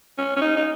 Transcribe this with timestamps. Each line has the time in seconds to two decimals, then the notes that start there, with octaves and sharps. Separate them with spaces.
0.18 C#4
0.36 C#4
0.41 D#4
0.57 D#4